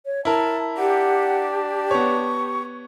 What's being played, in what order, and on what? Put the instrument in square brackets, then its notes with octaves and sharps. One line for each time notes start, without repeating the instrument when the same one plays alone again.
[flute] C#5
[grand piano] E4 A#4 [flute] A5
[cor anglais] D4 [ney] G4 [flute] F#5
[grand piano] B3 C#5 [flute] C#6